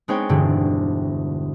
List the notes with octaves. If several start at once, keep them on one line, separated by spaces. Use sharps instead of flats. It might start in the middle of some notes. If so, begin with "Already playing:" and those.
G#3 B3 C4 D#4 C#5 G5
E1 G2 D3